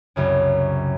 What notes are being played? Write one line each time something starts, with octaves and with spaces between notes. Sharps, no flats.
C2 F#2 C#3